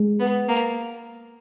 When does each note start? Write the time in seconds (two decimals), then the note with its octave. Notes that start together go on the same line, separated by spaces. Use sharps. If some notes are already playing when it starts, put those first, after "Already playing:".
Already playing: G#3
0.20 B3
0.49 A#3